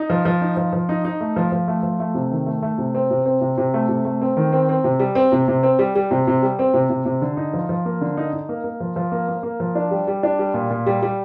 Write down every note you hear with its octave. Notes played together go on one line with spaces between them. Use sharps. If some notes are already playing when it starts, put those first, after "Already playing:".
Already playing: D#4
F3
F3
D#4
F3
F3
D#4
D#4
A3
F3
F3
A3
F3
A3
C3
D#3
A3
A3
C3
C4
C3
C4
C3
C3
A3
C3
A3
C4
D#3
C4
C4
C3
G3
C4
C3
C3
C4
G3
G3
C3
C3
G3
C4
C3
C3
C3
D3
D#4
F3
F3
A#3
D3
D#4
D#4
A#3
A#3
F3
F3
A#3
A#3
A#3
F3
D4
G3
G3
D4
G3
A#2
A#2
G3
G3